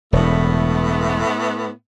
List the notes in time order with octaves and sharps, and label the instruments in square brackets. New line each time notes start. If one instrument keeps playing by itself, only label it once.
[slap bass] E1 [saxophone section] A2 A3 B3